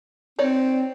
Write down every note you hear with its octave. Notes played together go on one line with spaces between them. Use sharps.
C4 D#4 C#5 D5